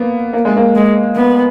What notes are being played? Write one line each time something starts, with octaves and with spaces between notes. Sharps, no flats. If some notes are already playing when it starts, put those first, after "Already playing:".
Already playing: A#3 B3
A#3
G#3
A#3
G#3
B3